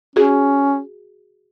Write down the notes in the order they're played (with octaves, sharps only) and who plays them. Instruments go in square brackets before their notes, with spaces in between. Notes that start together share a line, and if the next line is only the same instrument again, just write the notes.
[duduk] C#4 [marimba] F#4 G#4